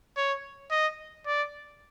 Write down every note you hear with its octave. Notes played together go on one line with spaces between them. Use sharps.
C#5
D#5
D5